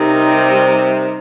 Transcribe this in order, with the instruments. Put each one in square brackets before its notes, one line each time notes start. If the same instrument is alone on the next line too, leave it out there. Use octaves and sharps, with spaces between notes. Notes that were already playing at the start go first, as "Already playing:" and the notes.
Already playing: [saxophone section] C3 [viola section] G3 D#4 A#4